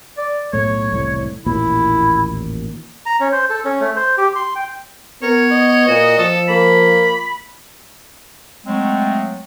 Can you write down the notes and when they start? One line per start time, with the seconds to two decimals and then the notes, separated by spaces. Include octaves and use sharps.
0.18 D5
0.53 B1 A2 A3 C#5
0.90 E1 C2 A2
1.46 A1 D#2 A#2 E4
3.06 A#5
3.20 C#4
3.32 C5
3.50 A4
3.65 C#4
3.81 A3
3.96 C5
4.18 G4
4.36 C6
4.55 G5
5.23 B3 A#4 C#5
5.51 D#5
5.88 A#2 F#4
6.19 F3 A4
6.49 A#3 B5
8.66 F#3 G#3 A3 C4